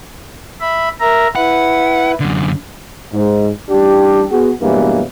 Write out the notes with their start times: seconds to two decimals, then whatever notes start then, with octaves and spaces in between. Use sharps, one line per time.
0.61 E5 B5
1.00 A#4 E5 A#5
1.36 E4 B4 F#5
2.20 F#2 D3
3.13 G#2
3.70 A1 G3 D4 G4
4.31 B3 F#4 G#4
4.62 G2 B2 E3 F#3 G#3 A#3